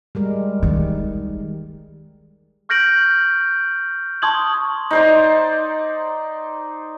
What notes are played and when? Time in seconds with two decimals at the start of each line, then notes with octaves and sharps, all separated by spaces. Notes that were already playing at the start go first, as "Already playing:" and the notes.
0.15 G3 G#3 A#4
0.63 D#3
2.69 C#6 F6 G6 A#6 D7 F#7
4.22 A5 C6 C#6 D#6 G#6 F#7
4.91 D#4 C5 D5